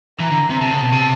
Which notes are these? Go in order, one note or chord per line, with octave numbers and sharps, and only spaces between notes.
E3 A#5
D3
C3
C3 A5
C#3
B2
C3